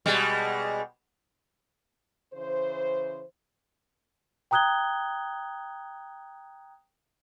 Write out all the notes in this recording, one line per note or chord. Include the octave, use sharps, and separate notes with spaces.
B2 G3 G#3
C#3 E3 C5
G5 A#5 D#6 F#6 G#6 G7